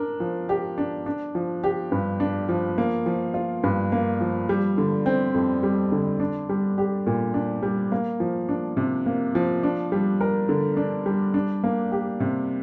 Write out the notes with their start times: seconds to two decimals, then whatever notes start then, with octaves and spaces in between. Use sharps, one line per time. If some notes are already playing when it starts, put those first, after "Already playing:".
Already playing: D4 A#4
0.20 F3
0.49 G4
0.78 D4
1.06 D4
1.35 F3
1.64 G4
1.92 G2
2.20 D4
2.49 F3
2.78 A#3
3.06 F3
3.34 F4
3.63 G2
3.92 A#3
4.21 F3
4.49 G3
4.78 D3
5.06 C4
5.34 F2
5.63 G3
5.92 D3
6.20 D4
6.49 G3
6.78 G4
7.07 A#2
7.34 D4
7.62 G3
7.92 A#3
8.20 F3
8.49 D4
8.77 C3
9.06 A#3
9.35 F3
9.63 D4
9.92 G3
10.21 A#4
10.49 D3
10.77 D4
11.06 G3
11.34 D4
11.64 A#3
11.92 G4
12.20 C3